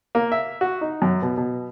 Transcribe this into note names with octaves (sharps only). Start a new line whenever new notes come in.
A#3
E5
F#4
D#4
F#2
B2
B2